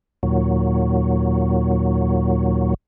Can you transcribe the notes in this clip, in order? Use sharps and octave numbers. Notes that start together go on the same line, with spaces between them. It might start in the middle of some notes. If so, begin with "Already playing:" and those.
D#2 A#2 F#3